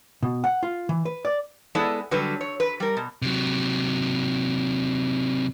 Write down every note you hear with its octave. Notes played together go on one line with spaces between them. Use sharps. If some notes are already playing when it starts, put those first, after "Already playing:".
B2
F#5
F4
E3
B4
D5
G#3 B3 E4 G#4 A4 D5
D3 F#3 G3 B4
C#5
B4
G3 A#4
B2
C3 F#3